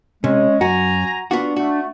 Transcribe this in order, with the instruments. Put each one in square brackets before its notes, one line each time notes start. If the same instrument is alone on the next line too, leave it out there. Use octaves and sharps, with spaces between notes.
[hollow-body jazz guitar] C3 [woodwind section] G#3 [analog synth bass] C#4
[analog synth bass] F#2 [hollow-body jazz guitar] F#4 [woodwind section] G#5 A#5
[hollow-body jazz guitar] B3 F4 F#4 [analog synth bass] D4
[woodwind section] A3 [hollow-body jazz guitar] F#4